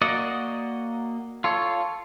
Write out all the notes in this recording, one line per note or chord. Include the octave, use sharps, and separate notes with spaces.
A#3 F#4 D5 D#5 F#5
F4 A4 C#5